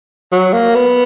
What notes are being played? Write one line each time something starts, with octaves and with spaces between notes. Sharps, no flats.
F#3
A#3
B3